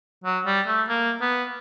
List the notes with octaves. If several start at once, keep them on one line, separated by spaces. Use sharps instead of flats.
F#3
G3
A3
A#3
B3